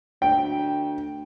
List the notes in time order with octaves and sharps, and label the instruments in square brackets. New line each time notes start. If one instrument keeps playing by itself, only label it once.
[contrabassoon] D2 [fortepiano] G5